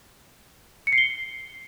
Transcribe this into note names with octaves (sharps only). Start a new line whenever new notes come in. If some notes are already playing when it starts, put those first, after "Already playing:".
C#7
C7
G7